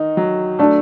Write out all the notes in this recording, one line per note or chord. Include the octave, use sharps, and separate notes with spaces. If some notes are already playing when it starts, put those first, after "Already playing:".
Already playing: D#3 D#4
F#3
A3 D4